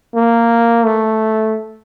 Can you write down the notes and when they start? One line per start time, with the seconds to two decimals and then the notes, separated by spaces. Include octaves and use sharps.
0.15 A#3
0.85 A3